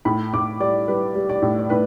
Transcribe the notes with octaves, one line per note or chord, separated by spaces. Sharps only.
A2 B5
A2 D6
G3 D5
G3 B4
G3
D5
A2
D5
A2 B4